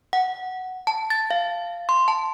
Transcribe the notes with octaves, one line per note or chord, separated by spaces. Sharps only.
F#5
A5
A6
F5
C6
A5